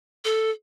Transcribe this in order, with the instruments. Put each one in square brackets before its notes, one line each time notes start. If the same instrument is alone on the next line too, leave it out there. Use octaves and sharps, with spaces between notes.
[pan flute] A4